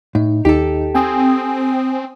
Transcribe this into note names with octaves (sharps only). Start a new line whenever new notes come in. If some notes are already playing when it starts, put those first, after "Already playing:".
A2 D#4
D#2 D#4 G4 A4
C4 G5 G#5 D#6